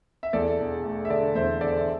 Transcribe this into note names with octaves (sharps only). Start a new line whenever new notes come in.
E5
E2 A4 D5
E1
A3
E5
D3 A4 D5
E2 C5 E5
E1 A4 D5
E5